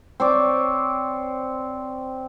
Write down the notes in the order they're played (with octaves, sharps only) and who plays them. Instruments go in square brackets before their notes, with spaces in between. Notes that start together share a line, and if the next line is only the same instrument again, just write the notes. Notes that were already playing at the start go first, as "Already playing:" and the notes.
[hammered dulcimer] C4 C#5 D5